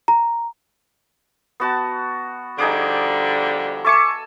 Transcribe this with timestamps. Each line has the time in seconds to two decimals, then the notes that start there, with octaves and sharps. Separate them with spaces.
0.08 A#5
1.60 B3 F#4 A5
2.58 D3 F3 G3 D#4 G#4 D6
3.85 A4 E5 G#5 C#6 D6 C#7